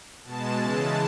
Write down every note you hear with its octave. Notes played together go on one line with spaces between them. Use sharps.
B2 G#3 A5
C#3 E3 G#3